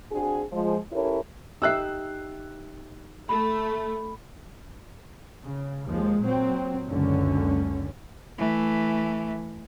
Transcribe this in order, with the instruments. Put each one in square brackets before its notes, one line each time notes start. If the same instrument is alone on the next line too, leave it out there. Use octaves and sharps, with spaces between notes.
[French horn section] C4 D4 F#4 G#4
F3 G#3
C#4 E4 G4 A4 A#4 C#5
[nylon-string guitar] D#4 G4 E5 [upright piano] E6 F#6 C7
[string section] A3 [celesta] B5
[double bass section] C#3
D#2 F3 G#3
A#2 F#3 C4
F#1 C#2 F#2 D3 C#4
[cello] E3 A3